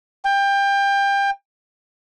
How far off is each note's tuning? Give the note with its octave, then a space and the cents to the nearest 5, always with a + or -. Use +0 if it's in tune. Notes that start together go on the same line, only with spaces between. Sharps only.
G5 +25